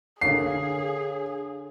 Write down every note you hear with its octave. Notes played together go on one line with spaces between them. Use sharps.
D3 G#4 A#4 C#5 F5 C7